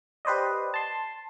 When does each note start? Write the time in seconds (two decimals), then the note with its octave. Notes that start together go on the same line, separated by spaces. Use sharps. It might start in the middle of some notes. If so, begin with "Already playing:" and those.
0.25 G4 B4 C5 D5 D#5
0.74 A5 C6